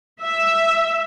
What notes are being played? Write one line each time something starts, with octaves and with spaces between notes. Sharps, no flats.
E5